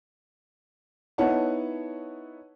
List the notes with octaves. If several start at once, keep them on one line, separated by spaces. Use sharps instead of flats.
B3 D#4 E4 C#5 F#5 A5